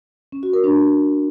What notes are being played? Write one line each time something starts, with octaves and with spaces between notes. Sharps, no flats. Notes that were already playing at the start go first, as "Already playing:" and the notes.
C#4
F#4
A#4
D4